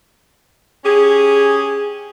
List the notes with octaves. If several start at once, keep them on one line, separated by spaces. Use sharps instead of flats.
C#4 G4 G#4